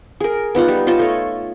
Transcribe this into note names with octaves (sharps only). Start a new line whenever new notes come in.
G#4 A#4
B3 D#4 F4 F#5
G3
F4 C#5 D#5 A5
A3 C#5